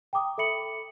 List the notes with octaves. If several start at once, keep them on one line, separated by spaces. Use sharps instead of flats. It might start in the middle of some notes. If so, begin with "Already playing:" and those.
G5 A#5 D6 D#6
A4 E5 B5 C#7 F#7